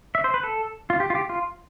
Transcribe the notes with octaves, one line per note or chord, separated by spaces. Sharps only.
E5
C5
B4
A4
F4
G4
F4
G4
F4